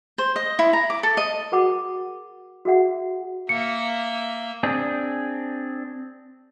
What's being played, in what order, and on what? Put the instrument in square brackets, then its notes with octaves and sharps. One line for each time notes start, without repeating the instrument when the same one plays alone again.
[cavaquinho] C5
D#5
E4
A#5
D6
A4
D#5
[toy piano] F#4 G#4 A#4 F#5 B5 D6
F#4 G#4 E5 F#5
[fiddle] A#3 E5 [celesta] C#7
[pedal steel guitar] C4 D4 G#4